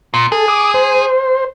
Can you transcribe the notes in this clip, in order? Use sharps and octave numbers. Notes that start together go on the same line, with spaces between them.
A#2
G#4 A4
D6 D#6
C5